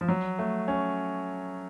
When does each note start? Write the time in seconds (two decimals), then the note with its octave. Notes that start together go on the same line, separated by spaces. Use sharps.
0.01 F3
0.08 F#3
0.39 A3
0.68 C#4